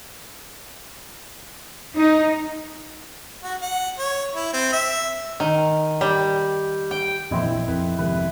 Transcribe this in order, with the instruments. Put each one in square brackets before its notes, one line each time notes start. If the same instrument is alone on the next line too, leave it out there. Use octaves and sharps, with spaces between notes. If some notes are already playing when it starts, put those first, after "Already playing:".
[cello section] D#4
[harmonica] F#4
F#5
C#5
E4
C4
E5
[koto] D#3
G3
G5
[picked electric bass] F2 A#2 E3 [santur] C4 E4 D#5
[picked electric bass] A#1
[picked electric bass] F2 [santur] B4
[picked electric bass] G#1 F2 C3 [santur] B4